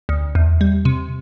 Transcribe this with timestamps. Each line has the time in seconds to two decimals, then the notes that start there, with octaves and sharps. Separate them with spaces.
0.09 D2
0.35 E2
0.61 G3
0.85 C3